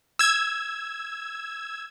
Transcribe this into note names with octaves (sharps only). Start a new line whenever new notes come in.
E6 G#6